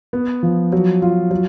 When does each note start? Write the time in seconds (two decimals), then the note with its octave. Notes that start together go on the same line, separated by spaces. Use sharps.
0.13 B3
0.43 F3
0.72 F#3
1.02 F4
1.31 F#3